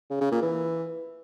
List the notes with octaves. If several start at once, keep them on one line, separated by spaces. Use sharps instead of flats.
C#3
C#3
A#2
E3